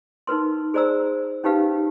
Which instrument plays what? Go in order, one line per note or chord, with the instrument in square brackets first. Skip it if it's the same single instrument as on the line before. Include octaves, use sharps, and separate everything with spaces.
[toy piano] D#4 A#4 B4 C6
G#4 C5 D5 A#5 E6
C#4 D#4 G4 B4 F5